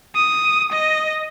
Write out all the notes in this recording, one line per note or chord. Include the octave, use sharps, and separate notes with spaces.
D#6
D#5